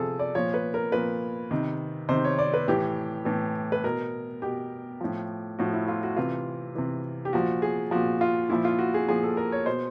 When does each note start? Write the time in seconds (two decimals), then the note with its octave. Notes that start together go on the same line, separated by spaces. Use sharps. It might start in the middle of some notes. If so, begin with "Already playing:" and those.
Already playing: C3 F3 G#4 A4
0.19 D5
0.35 A#2 F3 C#5
0.54 B4
0.74 A#4
0.92 A#2 F3 B4
1.51 C3 D#3
2.09 C3 D#3 C5
2.24 C#5
2.39 D5
2.54 B4
2.68 A2 E3 G4
3.25 A2 E3
3.72 B4
3.84 B2 A#4
4.42 B2 G4
5.01 A2 F3
5.59 A2 F3 F#4
5.73 E4
5.88 F4
6.03 F#4
6.16 C3 E3 F4
6.75 C3 E3
7.25 G4
7.33 A#2 F3 F#4
7.62 G#4
7.91 A#2 F3 F#4
8.21 F4
8.50 A#2 F3 E4
8.65 F4
8.79 F#4
8.94 G#4
9.09 A#2 F3 G#4
9.23 A4
9.37 A#4
9.52 C#5
9.66 B2 C5